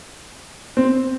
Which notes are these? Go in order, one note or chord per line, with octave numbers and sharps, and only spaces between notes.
C4